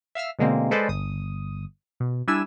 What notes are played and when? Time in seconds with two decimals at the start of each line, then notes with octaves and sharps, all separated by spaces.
0.15 E5 F5 E6 F6
0.39 B2 D3 G#3 A#3 C4
0.71 G#3 A4 B4 C5 D5 D#5
0.88 G1 D#6
2.00 B2
2.28 G3 D4 E4 G#5 E6 E7